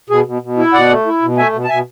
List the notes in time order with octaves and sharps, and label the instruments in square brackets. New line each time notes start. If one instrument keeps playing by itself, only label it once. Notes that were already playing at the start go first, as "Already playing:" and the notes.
[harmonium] B2 G#4
B2
B2
E4
B2 D5 F#5
A3
E4
B2
A3 E5 G#5
B2
A5
B2 E5 G#5